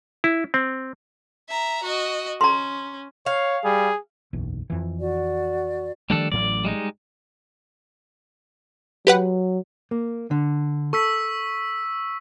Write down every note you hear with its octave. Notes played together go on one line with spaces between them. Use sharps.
E4
C4
E5 A#5
F#4 D#5
C#4 A#5 C6
C#5 F5
G3 G#4
F#1 B1 E2
F2 E3
F#4 D5
D#3 F3 G3 A3 D4 A4
A1 A2 F#3 D5
G3 G#3 D#4
F#3 G4 B4 F#5
A#3
D3
A4 C#6 E6 B6